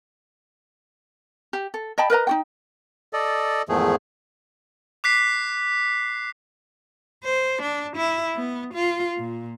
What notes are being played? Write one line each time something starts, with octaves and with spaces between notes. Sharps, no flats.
G4
A4
D#5 G5 A5 B5
A#4 B4 D#5 A#5
D#4 F#4 G5
A4 D5 D#5
E2 G#2 D#3 F3 A3 G#4
D6 F#6 B6 C7
C5
D4
E4
B3
F4
A#2